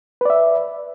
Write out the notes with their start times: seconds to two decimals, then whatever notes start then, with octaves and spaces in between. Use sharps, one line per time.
0.21 B4
0.25 D5
0.30 E5